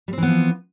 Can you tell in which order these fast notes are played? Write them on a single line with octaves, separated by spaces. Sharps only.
G3 C4 E3 B3 F3